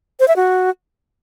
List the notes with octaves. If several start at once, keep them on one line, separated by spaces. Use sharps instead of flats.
C5
E5
F#4